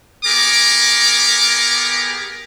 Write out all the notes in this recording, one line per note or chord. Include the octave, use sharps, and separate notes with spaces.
B3 G4 G#4 A#4 D6